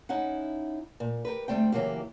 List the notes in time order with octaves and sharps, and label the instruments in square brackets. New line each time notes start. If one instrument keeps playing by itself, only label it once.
[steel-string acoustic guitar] C#4 D#4 E4 F#5
A#2
G4 A#4 B4
D2 G#2 G3 A3 C4 G5
C#3 E3 F#3 A#3 F#4 G4